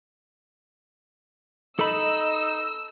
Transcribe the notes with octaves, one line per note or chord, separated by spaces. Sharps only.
D#4 A4 D#5 B5 E6